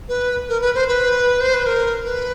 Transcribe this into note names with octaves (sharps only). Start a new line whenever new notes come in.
B4
A#4
B4
C5
B4
C5
B4
A#4
B4